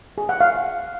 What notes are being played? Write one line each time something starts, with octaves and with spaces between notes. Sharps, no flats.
G#4
F#5
F5